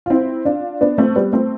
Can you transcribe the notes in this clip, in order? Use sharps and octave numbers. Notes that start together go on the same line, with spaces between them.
F4
C4 E4
D4 F4
B3 D4
A3 C4
G3 B3
A3 C4